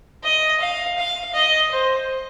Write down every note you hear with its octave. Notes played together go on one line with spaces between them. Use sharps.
D#5
F5
F5
D#5
C5